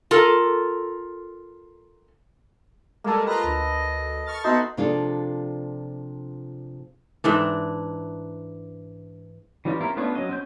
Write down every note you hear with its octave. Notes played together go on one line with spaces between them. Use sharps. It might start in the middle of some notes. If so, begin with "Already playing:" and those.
F4 A4 A#4
G3 G#3 A#3 A4
F4 B4 D#5 A#5 A#6
D2
C#6 F6 A6
B3 D#4 F#4 E5 A5 C6
C3 F3 D4 F4 G#4 A4
G#2 E3 D4
E3 G3 C#4 D#4 F4
C4 C#4 E4 F4 A#4
A3 B3 C#4 D4 F4
F#3 C#4 D#5
C4 C#4 G6